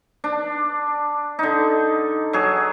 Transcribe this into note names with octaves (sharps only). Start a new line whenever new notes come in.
D4
D3 D#4
F#3 G#4